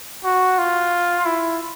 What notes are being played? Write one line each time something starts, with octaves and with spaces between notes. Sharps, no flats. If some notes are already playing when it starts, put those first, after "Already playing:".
F#4
F4
E4